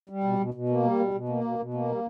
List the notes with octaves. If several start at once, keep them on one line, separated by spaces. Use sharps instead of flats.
G3
B2
B2
B2
A#3
G3
B2
B2
A#3
B2
B2
A#3
G3